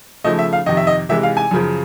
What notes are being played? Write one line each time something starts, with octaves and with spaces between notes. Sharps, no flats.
C#3 F3 A3 D#5
E5
F5
F2 C3 D#3 D#5
E5
D#5
C3 E3 G#3 E5
F5
G#5
F#2 C#3 F3